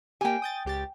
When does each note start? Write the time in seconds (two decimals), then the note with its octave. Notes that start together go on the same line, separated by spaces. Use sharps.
0.21 A#3 G4 G5 G#5
0.42 D#6 G6 A6
0.65 C#2 G4 A6